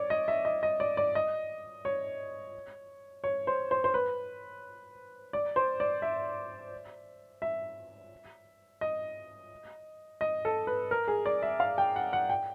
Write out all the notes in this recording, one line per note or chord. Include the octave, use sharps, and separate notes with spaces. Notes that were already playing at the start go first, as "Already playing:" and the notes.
Already playing: C#5 D5
D#5
E5
D#5
D#5
D5
D5
D#5
C#5
C#5
C5
C5
C5
B4
D5
C5
D5
E5
E5
D#5
D#5
A4
B4
A#4
G#4
D5
E5
F5
G5
F#5
F#5
G5